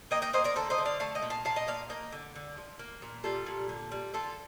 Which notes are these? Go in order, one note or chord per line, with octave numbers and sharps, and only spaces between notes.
A#3 D#5 G5
D#5 G5
A#3 C5 D#5
A#4 D5
D3 A4 C5
C5 D#5
D3
D5 F5
A3 F5 A5
D#5 G5
A#2
F5 A5
A#2 F5 A5
D#5 G5
A#2 D5 F5
A#3 D#5 G5
D3
D3
F3
A#3
A#2
G3 F4 A4
A#2
D3
G3
D3 F4 A4